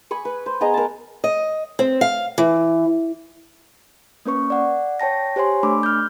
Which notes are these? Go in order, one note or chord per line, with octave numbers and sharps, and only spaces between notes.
G#5 B5 C#6 D#6
B4
C5
B3 G#4 D#5 A#5
A#4 A5
D#5
C4
F5
E3
A#3 C#4 B4 C#6
D5 F#5
C#5 G5 A5 A#6
G4 C5 C#5 G#5 C6
A3 D4 B5 D6
F6 G6